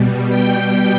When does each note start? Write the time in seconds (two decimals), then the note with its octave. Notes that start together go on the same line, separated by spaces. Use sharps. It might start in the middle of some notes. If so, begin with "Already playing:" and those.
Already playing: B2 G3
0.29 G5